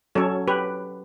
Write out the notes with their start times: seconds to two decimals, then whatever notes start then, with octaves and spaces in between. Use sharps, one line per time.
0.15 F#3 C#4 A4 C#5
0.48 G4 B4